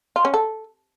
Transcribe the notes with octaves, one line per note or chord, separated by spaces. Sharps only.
F4
C#4
A4